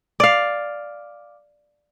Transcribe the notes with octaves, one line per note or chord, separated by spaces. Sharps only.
D5 F5